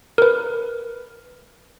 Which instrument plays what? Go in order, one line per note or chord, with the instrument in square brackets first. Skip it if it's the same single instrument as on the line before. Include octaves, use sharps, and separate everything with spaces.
[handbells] A#4 B4